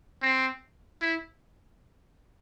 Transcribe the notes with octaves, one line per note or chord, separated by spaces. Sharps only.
C4
E4